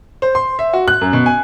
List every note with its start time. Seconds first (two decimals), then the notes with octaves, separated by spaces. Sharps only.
0.22 C5
0.35 C6
0.59 E5
0.73 F#4
0.88 F#6
1.01 F#2
1.13 B2
1.26 G#5